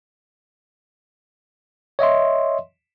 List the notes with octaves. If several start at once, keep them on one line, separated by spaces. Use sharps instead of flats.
C#5 D#5 E5 C6